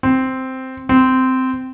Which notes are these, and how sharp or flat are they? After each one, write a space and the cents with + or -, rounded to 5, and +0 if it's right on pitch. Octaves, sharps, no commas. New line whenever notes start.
C4 -5
C4 -15